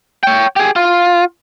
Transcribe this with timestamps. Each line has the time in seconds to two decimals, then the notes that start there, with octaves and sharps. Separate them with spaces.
0.23 C#5 G5
0.56 G4 G#4
0.76 F4